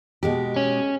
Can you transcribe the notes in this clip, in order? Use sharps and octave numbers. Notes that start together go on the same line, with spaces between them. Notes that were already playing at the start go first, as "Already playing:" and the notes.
B2 G#3 G4
C#4